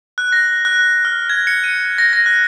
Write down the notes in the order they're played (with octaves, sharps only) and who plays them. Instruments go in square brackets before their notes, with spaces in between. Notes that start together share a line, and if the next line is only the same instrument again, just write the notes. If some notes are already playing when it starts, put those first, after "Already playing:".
[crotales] F#6
A#6
F#6
F#6
F6
G#6
C#7
D#7
A#6
A#6
F#6